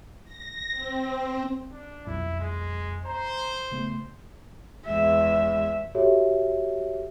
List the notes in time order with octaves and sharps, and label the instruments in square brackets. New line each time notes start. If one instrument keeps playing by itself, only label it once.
[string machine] A#6
C4
[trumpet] D4
[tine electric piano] B1 F2 [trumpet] E4
[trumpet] G#3
[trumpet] C5 [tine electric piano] A#5
[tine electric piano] C#3 A3 B3
[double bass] E2 G#3 [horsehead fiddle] E5
[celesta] F#4 G4 A4 C#5 E5